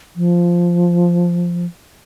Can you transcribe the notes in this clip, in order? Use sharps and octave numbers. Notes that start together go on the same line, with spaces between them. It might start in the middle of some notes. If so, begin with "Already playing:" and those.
F3